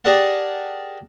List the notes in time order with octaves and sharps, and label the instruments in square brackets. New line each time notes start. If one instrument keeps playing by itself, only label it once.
[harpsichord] G4 G#4 A#4 D5 F#5 A5